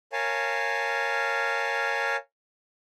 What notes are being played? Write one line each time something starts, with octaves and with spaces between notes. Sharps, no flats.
A#4 C#5 F5 G#5 A5